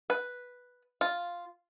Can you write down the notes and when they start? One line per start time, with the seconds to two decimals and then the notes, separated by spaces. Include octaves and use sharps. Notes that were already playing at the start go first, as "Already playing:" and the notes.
0.10 B4
1.01 F4